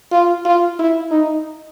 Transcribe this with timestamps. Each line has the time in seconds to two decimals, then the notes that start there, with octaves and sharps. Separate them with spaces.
0.11 F4
0.45 F4
0.79 E4
1.11 D#4